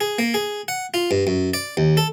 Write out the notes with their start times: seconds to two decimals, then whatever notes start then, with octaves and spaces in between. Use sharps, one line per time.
0.01 G#4
0.19 A#3
0.34 G#4
0.68 F#5
0.94 F4
1.11 G2
1.27 F#2
1.54 D5
1.77 D#2
1.97 A4